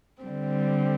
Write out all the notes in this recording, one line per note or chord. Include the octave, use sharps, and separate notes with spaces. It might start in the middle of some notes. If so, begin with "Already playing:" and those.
D3 G3 C4